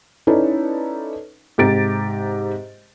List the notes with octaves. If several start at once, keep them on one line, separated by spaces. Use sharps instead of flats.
C#4 D#4 E4 A4 B4 D5
G#2 C3 G4 A#5 A6 D7